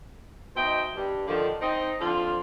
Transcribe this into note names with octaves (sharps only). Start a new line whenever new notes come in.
B2 D#4 C5 D#5 E5 G5
G2
D3 D#3 F3
C4 D#4
D3 F3 C4 F4